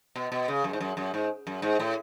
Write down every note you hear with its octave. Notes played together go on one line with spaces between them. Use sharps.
B2
B2
C#3
F#2
G#2
F#2
F#2
G#2
F#2
G#2
A2